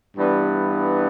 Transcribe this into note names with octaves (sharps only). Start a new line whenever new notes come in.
G2 E3 G3 B3